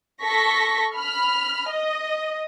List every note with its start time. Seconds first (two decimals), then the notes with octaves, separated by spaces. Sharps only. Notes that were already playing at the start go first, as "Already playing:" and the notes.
0.23 A4 C#6 A#6 B6
0.95 B5 F6
1.69 D#5